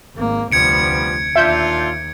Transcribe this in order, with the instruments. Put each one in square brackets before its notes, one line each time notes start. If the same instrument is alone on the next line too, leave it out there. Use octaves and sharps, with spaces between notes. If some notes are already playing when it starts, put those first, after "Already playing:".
[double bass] G#1 A#3
[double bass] F1 D2 [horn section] F3 G3 B3 [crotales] G#6 C#7 D7
[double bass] D#2 [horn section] A#2 D4 F4 [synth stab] E5 G6